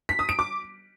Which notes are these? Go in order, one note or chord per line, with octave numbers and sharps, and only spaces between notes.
B6
D#6
D7
D6